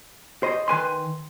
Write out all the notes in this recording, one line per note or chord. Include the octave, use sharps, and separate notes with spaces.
C5 D#5
D#3 B4 G#5 C6